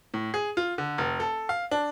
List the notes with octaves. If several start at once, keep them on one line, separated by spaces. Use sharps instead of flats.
A2
G#4
F4
D3
F1
A4
F5
D4